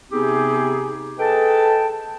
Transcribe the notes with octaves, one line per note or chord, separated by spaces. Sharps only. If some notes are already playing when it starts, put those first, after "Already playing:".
C3 B3 C4 D#4 G4 G#4
G#4 A4 B4 D#5 G5 A5